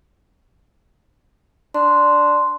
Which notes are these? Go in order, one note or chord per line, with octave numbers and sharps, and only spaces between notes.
D4 C6